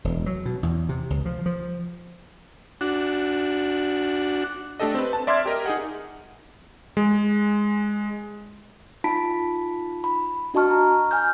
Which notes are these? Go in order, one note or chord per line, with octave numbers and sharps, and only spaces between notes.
E1
F#3
B2
E2
C3
C#2
F3
F3
D4 F#4
A3 D4 G4 A4 D#5
C4 B4
A5
D5 E5 C6 D6 F6 G#6
G4 A#4 D#5
D#4 G#4 F#5
G#3
D#4 F4 A5 B5 B6 D7
B5
D4 F#4 D#5 A5 C#6 F6
A#5
G#5 F6 G6